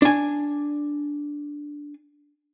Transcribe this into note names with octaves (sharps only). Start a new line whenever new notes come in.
D4 G#5